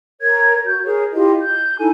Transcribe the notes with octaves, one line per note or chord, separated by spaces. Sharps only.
A#4 C#5 G#6
F#4 G6
G#4 A#4 C#5
E4 F4 G4 D#5
G6
D#4 E4 A4 G#5